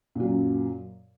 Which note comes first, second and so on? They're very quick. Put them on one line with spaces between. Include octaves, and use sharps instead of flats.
A#2 F#3 F#2